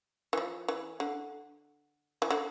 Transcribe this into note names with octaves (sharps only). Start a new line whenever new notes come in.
E3
F3
E3
D3
E3
D3